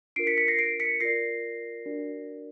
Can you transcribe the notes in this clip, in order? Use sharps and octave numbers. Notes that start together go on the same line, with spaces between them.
D4 F4 A#4 C7 D7
B6 C#7
B6 C#7
A#6 C7
C7 D7
B6 C#7
F4 A#4 D5 A#6 C7
D4 F#4 A#4 D5